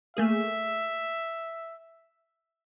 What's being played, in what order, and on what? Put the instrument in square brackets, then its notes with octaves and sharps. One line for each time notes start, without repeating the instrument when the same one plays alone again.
[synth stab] A3 A#3 G#4 [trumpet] E5